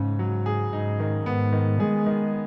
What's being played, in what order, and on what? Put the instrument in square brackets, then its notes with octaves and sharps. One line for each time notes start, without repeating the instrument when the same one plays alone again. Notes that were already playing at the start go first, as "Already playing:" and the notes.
Already playing: [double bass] G#2 [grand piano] C#3 C#4
[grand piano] F#3
G#4
[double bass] G#2 [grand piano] D#4
[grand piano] D#3
[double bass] G#2 [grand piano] B3
[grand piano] D#3
[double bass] G#3 [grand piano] G#4
[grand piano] D#3